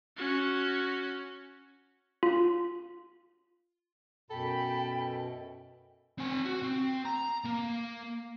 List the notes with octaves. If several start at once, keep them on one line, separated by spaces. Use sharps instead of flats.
C#4 F#4
F4
F#2 B2 A4 G5 B5
C4 G#5
F#4
C4
A#5
A#3